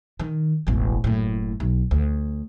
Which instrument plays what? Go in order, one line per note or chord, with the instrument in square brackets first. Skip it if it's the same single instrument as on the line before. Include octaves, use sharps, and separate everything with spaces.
[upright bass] D#3
E1 A1
F#1 A2
B1
D2